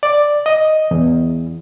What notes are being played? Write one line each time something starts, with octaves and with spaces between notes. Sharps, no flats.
D5
D#5
E2